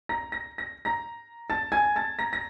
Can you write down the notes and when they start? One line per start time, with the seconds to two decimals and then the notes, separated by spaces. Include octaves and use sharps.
0.09 A#5 A#6
0.32 A#6
0.58 A#6
0.85 A#5 A#6
1.50 A5 A6
1.72 G#5 G#6
1.96 A5 A6
2.19 A#5 A#6
2.33 A#6